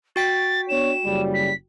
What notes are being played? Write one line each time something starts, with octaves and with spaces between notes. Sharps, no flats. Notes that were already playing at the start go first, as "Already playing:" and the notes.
F#4 G5 A6 B6
B3 D4 C#5 E7
F#1 C#3 G3
B6